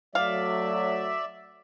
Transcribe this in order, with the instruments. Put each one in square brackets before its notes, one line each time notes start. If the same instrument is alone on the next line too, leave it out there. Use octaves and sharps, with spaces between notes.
[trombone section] F#3 A3 [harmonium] D5 E5 [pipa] F5